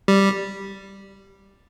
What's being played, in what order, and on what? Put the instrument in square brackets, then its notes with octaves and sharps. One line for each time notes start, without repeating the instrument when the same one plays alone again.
[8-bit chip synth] G3